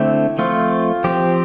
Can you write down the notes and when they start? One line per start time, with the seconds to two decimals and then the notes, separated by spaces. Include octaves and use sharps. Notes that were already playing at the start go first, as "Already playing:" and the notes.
Already playing: D3 A3 C4 E4
0.38 F3 A3 C4 F4
1.04 F3 C4 G4